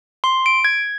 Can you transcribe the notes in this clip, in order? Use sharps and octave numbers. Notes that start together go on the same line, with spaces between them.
C6
D7
G#6